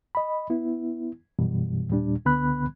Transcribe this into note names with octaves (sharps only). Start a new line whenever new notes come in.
D#5 B5
B3 E4
F#2 B2 E3 G3
D#2 A#2 G3 D4
C#2 D3 B3 B5 F#6